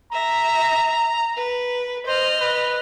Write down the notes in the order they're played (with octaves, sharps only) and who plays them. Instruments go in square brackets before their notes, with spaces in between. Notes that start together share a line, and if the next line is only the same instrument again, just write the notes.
[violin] E5 A#6 [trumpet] A#5
[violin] B4
[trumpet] C5 [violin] D#5 F6
[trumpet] B4